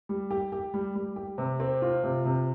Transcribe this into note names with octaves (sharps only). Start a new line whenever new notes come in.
G3
G4
G4
G3
G3
G4
C3
C4
F4
C3
C3